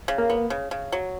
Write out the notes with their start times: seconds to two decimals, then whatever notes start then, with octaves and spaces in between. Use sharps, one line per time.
0.08 C#3
0.18 A#3
0.30 B3
0.50 C#3
0.71 C#3
0.92 F#3